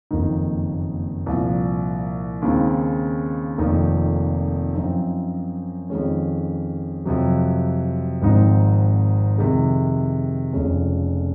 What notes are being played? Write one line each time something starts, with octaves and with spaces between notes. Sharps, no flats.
F#1 F2 D#3 A#3 D#4
C2 A#2 F3
D#2 C#3 G#3 C4 D#4
F1 F2 D#3 A#3 D#4
F#2 F3 C4 D#4
F2 D#3 G#3 C#4
F2 C3 F#3
G#1 G#2 F3 C4 D#4
F2 C3 D#3 G#3
F1 F2 C#3 G#3 C#4